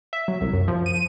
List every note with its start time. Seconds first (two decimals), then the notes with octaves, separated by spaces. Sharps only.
0.13 E5
0.28 F#3
0.41 C2
0.53 F#2
0.68 F3
0.86 D#7